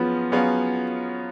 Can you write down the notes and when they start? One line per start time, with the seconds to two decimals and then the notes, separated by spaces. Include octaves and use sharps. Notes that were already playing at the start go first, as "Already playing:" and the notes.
Already playing: F3 F#3 B3 C#4 G#4
0.32 F#3 B3 C#4 G#4 C#5 F5